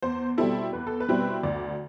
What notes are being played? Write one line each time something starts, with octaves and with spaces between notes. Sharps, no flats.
E2 C5
B2 G3 C4 E4 A4
E2 B4
A4
B4
B2 G3 C4 E4
D2 D5